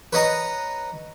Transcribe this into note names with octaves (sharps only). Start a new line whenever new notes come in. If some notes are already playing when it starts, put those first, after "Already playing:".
B4 C#5 D#5 A#5